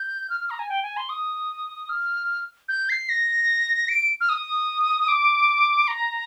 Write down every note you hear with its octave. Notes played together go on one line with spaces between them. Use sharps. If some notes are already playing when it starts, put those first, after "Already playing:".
Already playing: G6
F6
F6
A#5
G#5
G5
G#5
C6
D#6
F6
G6
C7
A#6
D7
F6
D#6
D6
A#5